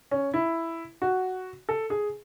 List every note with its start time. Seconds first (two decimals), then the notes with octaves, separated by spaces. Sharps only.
0.11 C#4
0.34 E4
1.02 F#4
1.69 A4
1.90 G#4